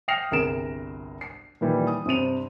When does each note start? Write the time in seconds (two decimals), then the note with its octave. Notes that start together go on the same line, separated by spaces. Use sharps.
0.08 G5 D#6 F6 A#6 C7 F7
0.31 G1 C2 G#4 A#4 D7 E7
1.21 C7
1.61 A#2 D#3 E3 G3
1.87 D#6
2.06 G2 C3 C5 D#7 F7